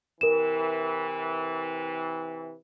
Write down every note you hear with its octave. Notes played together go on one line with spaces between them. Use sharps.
C3 E3 A#4 E7